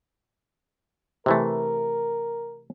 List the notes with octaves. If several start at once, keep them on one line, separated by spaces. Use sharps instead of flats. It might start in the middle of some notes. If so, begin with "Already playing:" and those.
C3 E3 A3 A#4